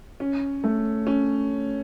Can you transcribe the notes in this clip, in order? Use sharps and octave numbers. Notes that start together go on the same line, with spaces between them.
C#4
A3
C#4